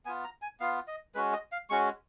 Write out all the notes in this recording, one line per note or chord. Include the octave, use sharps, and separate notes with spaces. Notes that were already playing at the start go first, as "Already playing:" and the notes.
B3 F4 G#5
A#5
G#5
B3 F4 F5
D#5
G#3 C#4 F#4 B4
D#5
F5
G#3 C#4 F#4 C#6